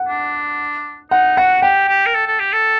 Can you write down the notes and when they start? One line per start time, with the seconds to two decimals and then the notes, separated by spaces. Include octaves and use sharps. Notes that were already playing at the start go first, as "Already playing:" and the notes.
Already playing: F#5
0.09 D4
1.11 D#4 F#5
1.37 F#4 F#5
1.62 G4 G5
1.89 G4
2.06 A#4
2.15 A4
2.27 A4
2.40 G4
2.53 A4